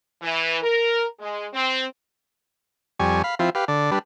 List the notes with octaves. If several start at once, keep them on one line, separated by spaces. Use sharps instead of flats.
E3
A#4
G#3
C4
F2 G3 G#5 C#6
F5 B5
F3 C4 E4 F4
G4 B4 F5
D3 D5
G3 D4 B4